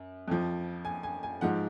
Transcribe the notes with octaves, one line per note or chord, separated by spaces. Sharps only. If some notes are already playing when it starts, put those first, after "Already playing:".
Already playing: F#2
F2 F3
G#5
G#5
G#5
G#2 F3 F#5